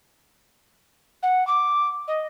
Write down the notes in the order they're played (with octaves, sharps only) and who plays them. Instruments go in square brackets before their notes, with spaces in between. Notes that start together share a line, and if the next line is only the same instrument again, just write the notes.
[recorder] F#5
D6
D#5